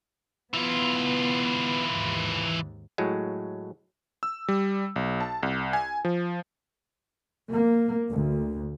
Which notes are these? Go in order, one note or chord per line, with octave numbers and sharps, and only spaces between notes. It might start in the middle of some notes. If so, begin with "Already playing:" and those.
E3 B3 F4
D#2 G#2
A2 F#3 G#3
E6
G3
B1
A5
C2
G#5
F3
A#3
D2